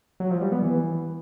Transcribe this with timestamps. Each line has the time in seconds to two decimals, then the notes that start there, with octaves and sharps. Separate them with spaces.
0.20 F#3
0.31 F3
0.41 G3
0.52 B3
0.62 E3